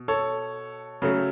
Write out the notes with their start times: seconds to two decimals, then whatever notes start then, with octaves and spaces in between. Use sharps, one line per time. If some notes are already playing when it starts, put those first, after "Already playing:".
Already playing: B2
0.08 A4 C#5
1.02 C#3 F#3 A3